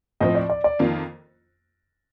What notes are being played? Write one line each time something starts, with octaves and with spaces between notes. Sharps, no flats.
A2 F3 C4 D#5
D5
D5
D5
F2 D#3 A#3 F4